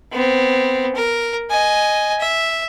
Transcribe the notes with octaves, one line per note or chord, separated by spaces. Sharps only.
B3 C4
A#4
D#5 G#5
E5